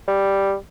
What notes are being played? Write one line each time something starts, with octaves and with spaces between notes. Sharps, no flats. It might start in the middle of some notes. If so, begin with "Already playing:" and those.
G3